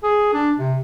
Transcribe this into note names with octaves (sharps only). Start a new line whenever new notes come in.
G#4
D4
C3